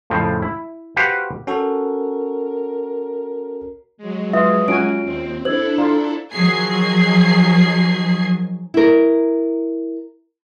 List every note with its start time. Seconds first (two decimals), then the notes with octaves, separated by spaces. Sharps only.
0.10 F2 A2 C#3 F3 C4
0.42 E4
0.96 F#4 G4 B4 C5 F5 F#5
1.47 C#4 F#4 A4 A#4
3.97 F#3 G#3
4.33 F4 B4 E5 D#6
4.68 C#4 F4 F#4 G#5 D7
5.03 D#2 C4
5.45 D4 E4 A4 C5 E6 G#6 F#7
5.78 F4 D5 A#5
6.32 D#3 F3 F#3 G#4 G#6 C7
8.74 E4 A#4